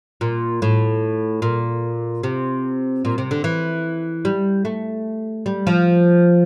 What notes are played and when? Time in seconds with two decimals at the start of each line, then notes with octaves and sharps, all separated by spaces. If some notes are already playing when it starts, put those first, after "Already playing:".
0.21 A#2
0.62 A2
1.42 A#2
2.23 C3
3.05 A#2
3.18 C3
3.31 D3
3.44 E3
4.25 G3
4.65 A3
5.46 G3
5.67 F3